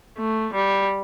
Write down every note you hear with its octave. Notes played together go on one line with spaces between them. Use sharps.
A3
G3